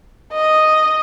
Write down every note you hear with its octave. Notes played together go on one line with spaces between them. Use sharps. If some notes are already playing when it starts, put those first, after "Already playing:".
D#5